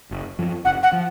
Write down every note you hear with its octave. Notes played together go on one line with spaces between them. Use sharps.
F#1
F#2 F3
F#1 F#5
F#5
F3